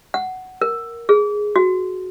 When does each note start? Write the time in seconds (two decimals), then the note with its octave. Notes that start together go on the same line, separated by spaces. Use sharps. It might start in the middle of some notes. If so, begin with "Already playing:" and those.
0.14 F#5
0.62 A#4
1.09 G#4
1.56 F#4